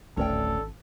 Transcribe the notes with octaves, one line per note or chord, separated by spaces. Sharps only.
D1 G#1 A3 C#4 A4 D5 G5